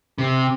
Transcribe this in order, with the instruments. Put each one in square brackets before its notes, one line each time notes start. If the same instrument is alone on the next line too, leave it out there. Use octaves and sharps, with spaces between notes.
[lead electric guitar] C3